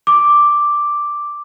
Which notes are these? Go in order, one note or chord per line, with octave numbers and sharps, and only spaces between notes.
D6